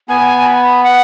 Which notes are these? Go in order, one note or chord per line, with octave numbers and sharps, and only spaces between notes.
B3 G#5
G#5
B5
B5
F#5